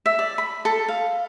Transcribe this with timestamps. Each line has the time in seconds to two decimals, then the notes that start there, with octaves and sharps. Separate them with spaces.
0.06 E5
0.19 D5
0.38 B5
0.65 A4
0.88 F5